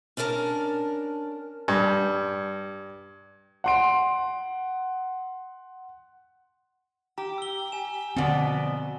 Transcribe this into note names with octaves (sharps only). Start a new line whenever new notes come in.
C#4 D4 E4 A#4 A5
G2
F#5 C6 D7
G4 A#5
E6 G7
G#5 E7
F2 B2 D3 C4 D5